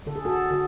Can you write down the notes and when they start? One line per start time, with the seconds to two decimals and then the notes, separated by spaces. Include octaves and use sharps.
0.06 D3 A4
0.16 G#4
0.25 F#4 A4
0.51 D3 F#4 A4